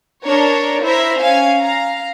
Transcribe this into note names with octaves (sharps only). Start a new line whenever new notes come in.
D4 A#4 C#5
E4 C5 E5 A#5
C#4 F5 G#5
F5 A#5